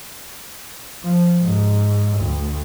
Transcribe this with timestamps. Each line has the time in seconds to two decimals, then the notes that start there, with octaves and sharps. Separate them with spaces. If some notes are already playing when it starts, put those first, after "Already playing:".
1.03 F3
1.37 G#2
2.17 D2